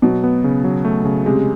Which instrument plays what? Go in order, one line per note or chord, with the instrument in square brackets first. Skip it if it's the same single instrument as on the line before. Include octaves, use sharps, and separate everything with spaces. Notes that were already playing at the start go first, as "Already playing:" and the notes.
[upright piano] B2 [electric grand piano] F#3
[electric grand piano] B3
C#3
F#3
A3
C#3
[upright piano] C3 [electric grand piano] G#3